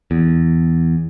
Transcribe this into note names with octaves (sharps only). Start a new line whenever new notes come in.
E2